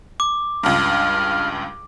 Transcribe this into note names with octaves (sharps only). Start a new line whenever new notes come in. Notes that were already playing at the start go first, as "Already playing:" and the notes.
D6
C#2 G2 F6